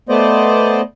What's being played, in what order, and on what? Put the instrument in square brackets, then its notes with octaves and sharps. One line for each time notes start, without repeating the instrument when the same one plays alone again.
[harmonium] A3 B3 C5 D5 D#5